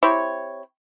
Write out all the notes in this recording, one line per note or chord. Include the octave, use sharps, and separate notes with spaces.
C4 E4 G4 C#5